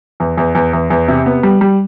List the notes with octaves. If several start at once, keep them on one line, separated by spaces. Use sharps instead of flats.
E2
E2
E2
E2
E2
C3
B3
G3
G3